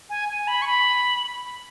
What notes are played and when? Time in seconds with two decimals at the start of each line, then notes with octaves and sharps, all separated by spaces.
0.10 G#5
0.29 G#5
0.48 B5
0.62 C#6
0.67 B5